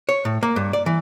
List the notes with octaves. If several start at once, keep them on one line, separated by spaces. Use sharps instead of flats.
C#5
A2
A#3
G2
D5
E3